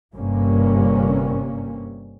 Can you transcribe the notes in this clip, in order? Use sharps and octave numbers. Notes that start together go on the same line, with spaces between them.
G1 G2 C3 G3 A#3 C#4